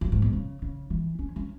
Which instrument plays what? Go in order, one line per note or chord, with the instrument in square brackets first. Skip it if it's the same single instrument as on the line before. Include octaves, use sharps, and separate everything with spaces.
[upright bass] F#2
G#2
B2
C#3
C#3
E3
C#4
C#4